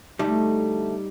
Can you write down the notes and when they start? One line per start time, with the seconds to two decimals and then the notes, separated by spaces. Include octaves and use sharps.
0.19 D2 G3 A3 D#4